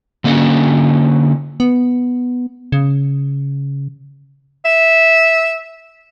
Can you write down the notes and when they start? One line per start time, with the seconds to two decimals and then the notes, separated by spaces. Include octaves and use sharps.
0.24 D3 A#3 C#4 A4
1.60 B3
2.72 C#3
4.65 E5